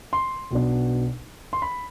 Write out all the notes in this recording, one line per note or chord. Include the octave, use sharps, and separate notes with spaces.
C6
B1 B2 B3 D4
C6
B5